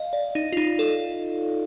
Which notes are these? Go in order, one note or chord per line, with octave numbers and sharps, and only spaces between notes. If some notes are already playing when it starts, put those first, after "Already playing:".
Already playing: D#5 F5
D5
D#4
F4
D#4
A4